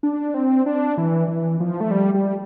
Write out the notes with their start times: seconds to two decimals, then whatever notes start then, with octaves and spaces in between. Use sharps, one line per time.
0.03 D4
0.34 C4
0.66 D4
0.98 E3
1.28 E3
1.60 F3
1.81 A3
1.91 G3
2.14 G3